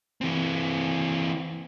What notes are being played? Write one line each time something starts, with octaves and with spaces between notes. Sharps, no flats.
E3 C4